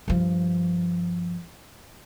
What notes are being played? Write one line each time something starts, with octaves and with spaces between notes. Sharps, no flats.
G2 F3